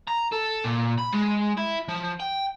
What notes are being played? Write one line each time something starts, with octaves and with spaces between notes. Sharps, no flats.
A#5
A4
A#2
B5
G#3
E4
F3
G5